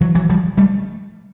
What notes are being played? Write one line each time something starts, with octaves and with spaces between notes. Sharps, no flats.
E3 F#3
E3 F#3
F3 G3
G3 A3